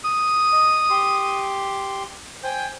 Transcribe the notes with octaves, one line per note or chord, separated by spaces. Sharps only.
D#6
D#5
G4 C6
C5 G5 G#5